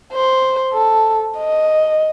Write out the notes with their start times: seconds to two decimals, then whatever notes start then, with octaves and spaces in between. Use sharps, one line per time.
0.13 C5
0.72 A4
1.38 D#5